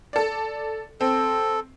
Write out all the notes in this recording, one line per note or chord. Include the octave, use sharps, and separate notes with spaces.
A4 D5
C4 A4